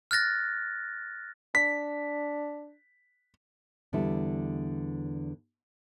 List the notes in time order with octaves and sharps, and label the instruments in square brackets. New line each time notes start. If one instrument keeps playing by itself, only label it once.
[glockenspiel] F6 F#6 A6 A#6
[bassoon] D4 [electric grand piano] B6
[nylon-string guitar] E2 D3 G3 E4